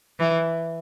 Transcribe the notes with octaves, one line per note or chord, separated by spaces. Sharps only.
E3